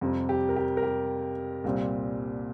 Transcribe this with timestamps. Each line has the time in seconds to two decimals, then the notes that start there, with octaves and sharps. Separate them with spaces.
0.01 F2 C3 G3 C4
0.29 G4
0.49 A#4
0.56 G4
0.77 A#4
0.83 G4
1.64 C2 A#2 G3 C4